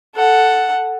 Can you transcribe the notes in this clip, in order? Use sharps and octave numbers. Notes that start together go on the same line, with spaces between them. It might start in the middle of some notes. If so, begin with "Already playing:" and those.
A4 F#5